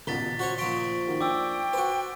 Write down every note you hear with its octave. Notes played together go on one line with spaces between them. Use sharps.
D#1 C#2 B2 A6 B6 G7
F#4 C5 C#5
A#2 F3 C6 C#6 B6 D7
D#3 F#4
D4 G5 D6 E6
F#4 B4 C5